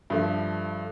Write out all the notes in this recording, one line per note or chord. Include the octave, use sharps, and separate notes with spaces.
G2 F3 A3